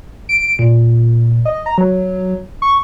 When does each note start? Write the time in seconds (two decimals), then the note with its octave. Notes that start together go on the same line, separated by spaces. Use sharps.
0.29 D7
0.59 A#2
1.45 D#5
1.66 A#5
1.78 F#3
2.62 C#6